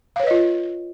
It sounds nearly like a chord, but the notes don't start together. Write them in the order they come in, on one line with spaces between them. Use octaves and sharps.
F5 C#5 B4 D#5 F4